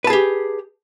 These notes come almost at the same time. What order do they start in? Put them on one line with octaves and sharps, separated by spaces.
B4 A5 G#4 G4